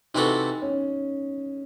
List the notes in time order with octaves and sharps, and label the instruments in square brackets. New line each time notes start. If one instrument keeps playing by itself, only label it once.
[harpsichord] C3 E3 C4 F#4 A4 [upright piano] D#4
[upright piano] C#4